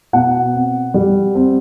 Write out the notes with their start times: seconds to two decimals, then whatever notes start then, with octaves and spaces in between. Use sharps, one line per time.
0.13 B2 F#5
0.54 C4
0.94 G3
1.35 C4